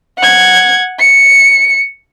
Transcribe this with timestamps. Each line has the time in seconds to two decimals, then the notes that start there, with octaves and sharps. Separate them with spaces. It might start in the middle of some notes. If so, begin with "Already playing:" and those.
0.18 F#5 G#6
0.99 C#7